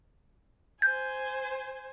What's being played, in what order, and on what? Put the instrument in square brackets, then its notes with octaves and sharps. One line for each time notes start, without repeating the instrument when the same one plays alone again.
[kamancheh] C5 G#5 [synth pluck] G6